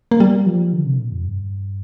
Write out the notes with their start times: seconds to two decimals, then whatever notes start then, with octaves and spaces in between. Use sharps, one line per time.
0.11 A#3
0.20 G3
0.46 F3
0.73 D3
0.85 C3
0.98 A#2
1.12 F2
1.25 G2